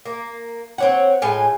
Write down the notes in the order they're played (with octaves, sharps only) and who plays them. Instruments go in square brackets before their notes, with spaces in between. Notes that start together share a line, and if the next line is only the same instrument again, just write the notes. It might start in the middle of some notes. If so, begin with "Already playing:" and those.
[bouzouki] A#3
C4 C#5 F#5
A2 G#3 F4 G#5